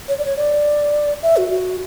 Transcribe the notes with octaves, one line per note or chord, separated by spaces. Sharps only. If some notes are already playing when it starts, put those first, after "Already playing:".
C#5
D5
C#5
D5
E5
F#4
F#4